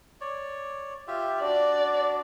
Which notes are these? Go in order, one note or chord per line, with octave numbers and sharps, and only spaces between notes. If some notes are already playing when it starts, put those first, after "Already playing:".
C#5 D5
F4 G4 E5
D4 F#4 D5